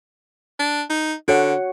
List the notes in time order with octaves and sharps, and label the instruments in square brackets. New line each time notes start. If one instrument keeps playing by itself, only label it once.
[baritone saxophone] D4
D#4
[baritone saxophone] D3 [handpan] F#4 C#5 F#5